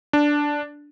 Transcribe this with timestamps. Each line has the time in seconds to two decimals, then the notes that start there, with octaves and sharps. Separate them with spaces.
0.13 D4